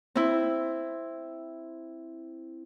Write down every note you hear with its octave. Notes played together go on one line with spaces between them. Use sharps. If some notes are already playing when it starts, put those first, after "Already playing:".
C4 E4